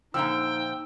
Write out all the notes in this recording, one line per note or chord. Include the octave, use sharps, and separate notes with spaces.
A#2 D3 F3 D#4 G5 E6